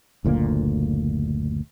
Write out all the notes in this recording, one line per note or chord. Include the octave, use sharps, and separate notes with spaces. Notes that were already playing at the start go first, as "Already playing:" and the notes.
F#1 D2 A#2 A#3